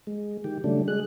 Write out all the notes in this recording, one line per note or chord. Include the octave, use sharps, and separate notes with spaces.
G#3
D#3 G4
C#3 F#3 G3 A3 D4
G#3 G#4 F#6